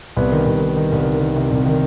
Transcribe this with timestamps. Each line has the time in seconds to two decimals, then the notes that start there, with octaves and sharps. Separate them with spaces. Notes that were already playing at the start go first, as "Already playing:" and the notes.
0.17 C2 B3 B4
0.32 D#3
0.47 C2
0.61 D#3
0.77 D#3
0.92 C2
1.07 D#3
1.21 D#3
1.36 C3
1.51 C2
1.66 D#3